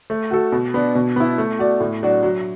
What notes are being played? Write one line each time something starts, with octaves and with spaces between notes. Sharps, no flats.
A3
F#4 A4
B2
B3 D4
B2
B3 E4
A3
F#4 D5
A2
F#3 D4 F#4 D5
F#3